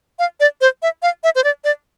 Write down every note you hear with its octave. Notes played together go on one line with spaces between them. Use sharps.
F5
D5
C5
E5
F5
E5
C5
D5
D5